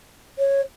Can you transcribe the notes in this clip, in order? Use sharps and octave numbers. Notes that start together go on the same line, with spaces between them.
C#5